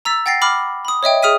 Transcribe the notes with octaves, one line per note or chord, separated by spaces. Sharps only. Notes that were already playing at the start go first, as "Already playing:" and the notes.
A#5 E6 A6 B6
F#5 G5 A6 A#6 C7
B5 D6 F6
B5 D#6
C#5 D#5 E5 G5
G#4 D#6 F6 B6 D#7